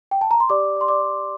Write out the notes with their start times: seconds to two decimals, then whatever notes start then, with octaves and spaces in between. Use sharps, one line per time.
0.11 G5
0.21 A5
0.31 A#5
0.40 C6
0.50 G4 D5 D6
0.77 D5
0.81 C6
0.88 D5 D6
1.01 D5